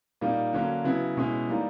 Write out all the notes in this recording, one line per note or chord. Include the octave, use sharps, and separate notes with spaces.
A#2 G3 A#3 D#4
D3 F#3 A#3 C#4
C#3 F#3 B3 E4
B2 G#3 C#4 E4
E3 G3 A#3 D#4